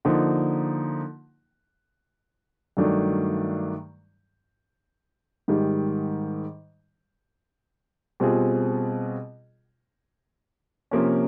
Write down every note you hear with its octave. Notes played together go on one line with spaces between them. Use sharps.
D3 F3 A#3 D#4
G2 D#3 F#3 A3 D4
G#2 D#3 G3
B2 G3 C4 F4 G#4
C3 F3 A#3 C#4